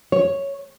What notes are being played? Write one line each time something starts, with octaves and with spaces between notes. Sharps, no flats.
C#5